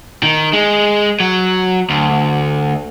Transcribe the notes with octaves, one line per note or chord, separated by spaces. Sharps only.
D#3
G#3
F#3
D2